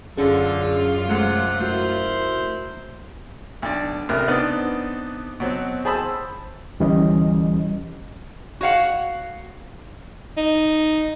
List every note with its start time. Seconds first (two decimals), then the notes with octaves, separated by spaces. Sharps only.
0.17 F#2 D3 C#4 F4 G#4
1.09 C3 G#3 A3 F#5
1.60 A3 E4 F#4 A#4 C5
3.62 B1 D4
4.09 A1 C3 A#4 F6
4.28 B3 C4 D4 D#4 B4
5.40 B2 F#3 C4
5.85 G#4 C5 A5 B5 D#6 E6
6.80 D2 E3 G3 C#4 D#5
8.61 F#4 C#5 F5 F#5
10.37 D#4